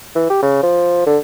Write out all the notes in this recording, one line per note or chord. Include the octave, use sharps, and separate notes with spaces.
E3
G4
C#3
F3
D3